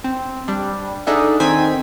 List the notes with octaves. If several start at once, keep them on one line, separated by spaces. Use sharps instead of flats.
C4
G3 D4
D4 D#4 G#4 A4 E5 F#5
D#3 C4 G#5 G#6 B6